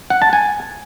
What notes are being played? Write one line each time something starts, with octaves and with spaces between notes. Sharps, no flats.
F#5
A5
G#5